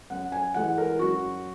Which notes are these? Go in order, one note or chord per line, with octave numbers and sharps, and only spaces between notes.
F#2 F#5
G#5
E3 G#3 F#5
A#4
F#2 F#4